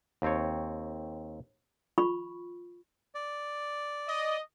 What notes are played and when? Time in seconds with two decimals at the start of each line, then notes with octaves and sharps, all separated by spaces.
0.22 D#2 C4 C#5
1.98 F4 B5 C#6
3.15 D5
4.08 D#5